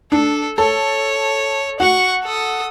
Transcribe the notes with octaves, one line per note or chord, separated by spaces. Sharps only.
D4 A4
A4 C#5
F#4 F#5 C#6
A4 D#6